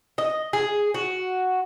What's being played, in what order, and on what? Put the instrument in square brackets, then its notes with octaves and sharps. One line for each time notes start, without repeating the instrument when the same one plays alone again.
[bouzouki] D#5
G#4
F#4